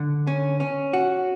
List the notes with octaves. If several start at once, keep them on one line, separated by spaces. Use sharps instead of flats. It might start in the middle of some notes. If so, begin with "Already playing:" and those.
Already playing: D3
C#4
C#4
F#4